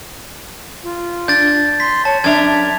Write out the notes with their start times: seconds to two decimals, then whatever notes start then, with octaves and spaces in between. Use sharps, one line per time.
0.83 F4
1.28 D4 G6 A6
1.80 C6 B6
2.05 C#5 A5
2.24 F#2 D4 E5 G#6 F7